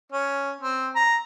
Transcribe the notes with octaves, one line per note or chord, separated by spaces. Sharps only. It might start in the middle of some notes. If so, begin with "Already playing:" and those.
C#4
C4
A#5